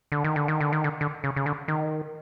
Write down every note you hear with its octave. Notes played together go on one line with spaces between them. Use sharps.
D3
D#3
D3
D#3
D3
D#3
D3
D3
C#3
C#3
D3
D#3